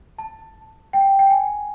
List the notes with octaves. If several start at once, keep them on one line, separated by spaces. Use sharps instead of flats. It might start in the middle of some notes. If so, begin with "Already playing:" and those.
A5
G5
G5
G#5